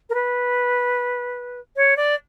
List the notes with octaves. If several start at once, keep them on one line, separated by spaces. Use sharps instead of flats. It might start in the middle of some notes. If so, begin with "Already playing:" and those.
A#4
B4
C#5
D5